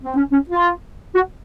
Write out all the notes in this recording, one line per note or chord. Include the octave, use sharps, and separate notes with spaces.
C4
C#4
C#4
F4
F#4